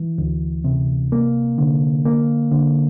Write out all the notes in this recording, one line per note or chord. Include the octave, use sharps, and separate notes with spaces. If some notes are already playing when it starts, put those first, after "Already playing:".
Already playing: E3
D2
C3
A#3
D3
A#3
D3